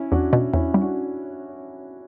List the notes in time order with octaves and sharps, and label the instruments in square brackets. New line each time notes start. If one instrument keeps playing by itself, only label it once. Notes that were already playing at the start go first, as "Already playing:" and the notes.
Already playing: [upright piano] C#4 E4
[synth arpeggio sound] E2 [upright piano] D4 F#4
[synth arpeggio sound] B2
[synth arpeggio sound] E2 [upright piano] C#4 E4
[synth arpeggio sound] G3
[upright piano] D4 F#4